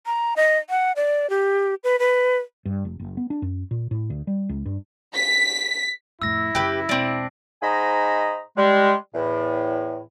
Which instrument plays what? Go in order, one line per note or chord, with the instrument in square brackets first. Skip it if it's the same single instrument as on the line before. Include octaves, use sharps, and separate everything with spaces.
[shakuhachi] A#5
D#5
F#5
D5
G4
B4
B4
[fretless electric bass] G2
F1
F#1
B3
D4
F#2
A#2
A2
D2
G3
C#2
G2
[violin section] B6
[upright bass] F2 A2 [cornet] E4 [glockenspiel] E6 A#6
[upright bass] F#2 C#3 [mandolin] G4 B4
[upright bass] E1 [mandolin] C4 D4
[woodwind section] G#2 C5 D#5 G#5 A#5 B5
G3 G#3
E2 A2